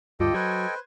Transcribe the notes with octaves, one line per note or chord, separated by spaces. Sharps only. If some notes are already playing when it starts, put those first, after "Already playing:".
D2 G2 F4 G4 A4 D#5 G5
F#3 B4 C5 G#6